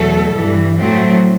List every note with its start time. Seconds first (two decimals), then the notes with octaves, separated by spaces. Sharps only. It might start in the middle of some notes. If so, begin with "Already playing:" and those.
Already playing: E2 B2 F#3 A3 A4
0.35 G2 E3 G3
0.78 A2 F#3 A3 C4